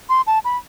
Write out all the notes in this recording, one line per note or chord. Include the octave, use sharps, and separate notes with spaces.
C6
A5
B5